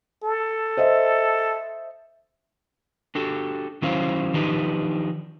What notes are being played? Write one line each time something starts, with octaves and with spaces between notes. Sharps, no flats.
A4
C5 D#5 E5
D4 F#4 G4 A4
D#3 F#3 C#4 E4 C5 F5
D#3 F3 D4 D#4 G4 B4